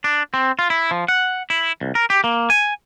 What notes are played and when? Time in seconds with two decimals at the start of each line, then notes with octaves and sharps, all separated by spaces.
0.04 D4
0.34 C4
0.59 F4
0.70 E4
0.91 F3
1.08 F#5
1.50 E4
1.81 C2
1.95 A#4
2.10 G4
2.24 A#3
2.50 G#5